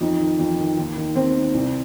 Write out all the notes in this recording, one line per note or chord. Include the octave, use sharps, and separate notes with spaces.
F2 D#4
D#3
F2
D#3
D#2
D#3
D#2 C4
D#3
C2